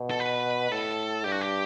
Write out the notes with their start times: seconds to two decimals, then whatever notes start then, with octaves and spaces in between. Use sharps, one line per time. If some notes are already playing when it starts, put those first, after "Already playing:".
Already playing: B2
0.11 A4
0.20 B4
0.71 A2 A4
1.24 G2 G4
1.32 F#4
1.41 G4